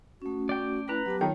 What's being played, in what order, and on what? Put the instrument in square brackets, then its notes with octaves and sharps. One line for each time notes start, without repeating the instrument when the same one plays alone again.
[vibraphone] A3 C#4 [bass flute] F#4
[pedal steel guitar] D5 G5
[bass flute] E4 [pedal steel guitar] B4 A#5
[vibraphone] F#3 B3 A5 [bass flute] G4
[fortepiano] D#3 [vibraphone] F4 C#5